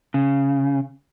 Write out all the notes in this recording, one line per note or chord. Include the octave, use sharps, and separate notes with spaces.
C#3